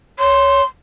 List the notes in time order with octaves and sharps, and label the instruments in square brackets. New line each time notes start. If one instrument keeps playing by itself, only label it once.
[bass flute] C#5 [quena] C6